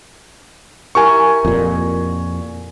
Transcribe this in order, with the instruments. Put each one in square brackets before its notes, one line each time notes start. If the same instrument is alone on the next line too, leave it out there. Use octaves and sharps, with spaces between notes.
[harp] E4 G4 A#4 [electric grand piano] G#5 C#6
[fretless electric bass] F2 A#2